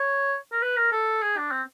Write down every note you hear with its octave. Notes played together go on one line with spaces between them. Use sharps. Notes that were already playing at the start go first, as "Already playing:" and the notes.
Already playing: C#5
A#4
B4
A#4
A4
G#4
D4
C4